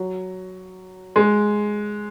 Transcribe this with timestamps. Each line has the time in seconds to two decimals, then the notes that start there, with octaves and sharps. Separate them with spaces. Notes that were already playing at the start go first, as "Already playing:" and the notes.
Already playing: F#3
1.16 G#3